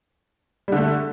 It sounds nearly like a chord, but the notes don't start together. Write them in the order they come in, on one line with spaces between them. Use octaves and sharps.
G3 D3 A3